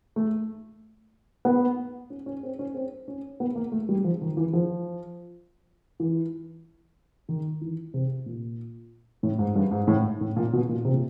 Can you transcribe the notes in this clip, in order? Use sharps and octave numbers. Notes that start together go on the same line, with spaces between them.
A3
B3
C#4
C#4
C4
C#4
C4
C#4
B3
A#3
A3
G3
F3
D#3
E3
F3
E3
D#3
E3
C3
A#2
A2
G#2
G2
G#2
A2
A2
A#2
B2
A#2
C3
A#2